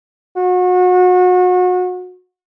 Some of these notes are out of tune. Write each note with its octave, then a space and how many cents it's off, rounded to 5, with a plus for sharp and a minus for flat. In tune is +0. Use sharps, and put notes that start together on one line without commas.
F#4 -30